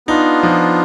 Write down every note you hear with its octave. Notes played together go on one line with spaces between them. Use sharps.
B3 D4 D#4 F4
F3